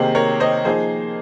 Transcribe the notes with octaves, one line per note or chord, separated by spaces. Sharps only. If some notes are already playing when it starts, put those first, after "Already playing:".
Already playing: C3 D#3 A#3 D#4 G#4 C5
A#4 C#5
C5 D#5
F3 A#3 D#4 G#4 C5